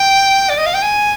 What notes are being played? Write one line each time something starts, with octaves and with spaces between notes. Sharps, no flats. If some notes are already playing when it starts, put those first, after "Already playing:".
Already playing: G5
D5
D#5
F5
G5
G#5